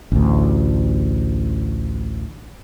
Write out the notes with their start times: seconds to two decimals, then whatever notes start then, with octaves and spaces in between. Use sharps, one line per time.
0.12 A1 D2